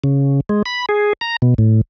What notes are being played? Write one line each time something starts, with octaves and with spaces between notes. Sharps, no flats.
C#3
G#3
B5
G#4
A#5
B2
A2